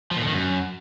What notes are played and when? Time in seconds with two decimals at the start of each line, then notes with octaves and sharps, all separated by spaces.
0.11 F3
0.17 A#2
0.22 D3
0.27 D#3
0.32 F#2